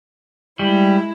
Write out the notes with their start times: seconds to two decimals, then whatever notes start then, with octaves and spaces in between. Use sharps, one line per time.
0.59 G3 G#3 E4